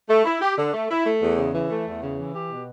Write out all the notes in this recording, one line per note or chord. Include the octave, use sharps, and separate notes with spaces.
A3
E4
G4
D3
A3
E4
A3
E2
C#3
E3
A3
E2
C#3
E3
G4
B2